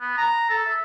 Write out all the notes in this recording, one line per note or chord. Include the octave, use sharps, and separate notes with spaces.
B3
A#5
A4
E5